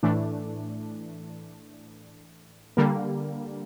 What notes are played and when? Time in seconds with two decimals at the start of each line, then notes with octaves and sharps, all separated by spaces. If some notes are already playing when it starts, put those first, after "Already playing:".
0.03 A2 E3 A3 D4
2.77 D3 G3 A#3